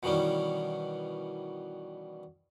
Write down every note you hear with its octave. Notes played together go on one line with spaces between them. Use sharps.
B2 D#3 E3 G3 C#4